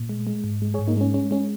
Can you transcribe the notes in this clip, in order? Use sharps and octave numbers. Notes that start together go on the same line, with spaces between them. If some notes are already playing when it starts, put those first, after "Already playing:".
Already playing: A#2
G#3
G#3
G#2
G#3
G#4 C#5
G#2
A#3 D#4
G#3 C#4
G#3 C#4
G#3 C#4